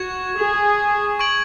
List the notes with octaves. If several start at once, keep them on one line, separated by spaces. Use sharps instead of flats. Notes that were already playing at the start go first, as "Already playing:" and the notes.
Already playing: F#4 C#6 G#6 E7
G#4
C#6 G#6 D7 F#7